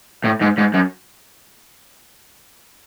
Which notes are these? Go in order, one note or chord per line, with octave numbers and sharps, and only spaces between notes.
A2
G#2
G#2
F#2